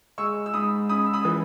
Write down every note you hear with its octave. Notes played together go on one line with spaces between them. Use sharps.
G#3 C#6 E6
E6
G#2 B5 D#6
C#4 B5 D#6
E6
B5 D#6
E3